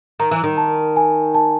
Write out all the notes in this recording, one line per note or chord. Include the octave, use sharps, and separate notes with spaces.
D#3 A#5
E3
D#3
A5
G#5
A5